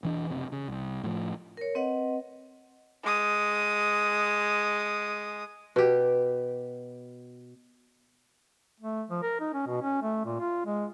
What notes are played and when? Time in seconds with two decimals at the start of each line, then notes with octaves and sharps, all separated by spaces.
0.03 E1 E3 D4
0.30 F#1 C3
0.52 C#3
0.68 C2
1.04 A2 F3
1.57 A#4 C#5
1.75 C4 B4 D#5 F#5
3.04 G#3 D#6
5.76 B2 G4
8.80 A3
9.10 F3
9.23 A#4
9.40 D#4
9.54 C#4
9.67 B2
9.82 C#4
10.02 A3
10.25 A#2
10.40 F4
10.65 G#3